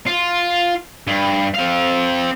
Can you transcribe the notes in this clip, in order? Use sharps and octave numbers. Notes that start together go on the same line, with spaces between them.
F4
G2
C4 F5